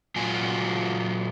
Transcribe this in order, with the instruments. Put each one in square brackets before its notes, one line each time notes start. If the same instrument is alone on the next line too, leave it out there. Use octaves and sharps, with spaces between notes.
[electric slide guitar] A#2 F#3 A#3 F4 F#4 G#5